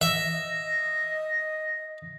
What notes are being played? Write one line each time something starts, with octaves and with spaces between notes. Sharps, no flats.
D#5 E5